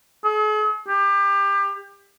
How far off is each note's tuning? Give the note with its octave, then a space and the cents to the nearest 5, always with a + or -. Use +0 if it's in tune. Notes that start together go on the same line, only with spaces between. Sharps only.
G#4 +45
G4 +25